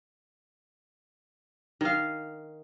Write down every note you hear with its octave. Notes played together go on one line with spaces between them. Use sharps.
D#3 F5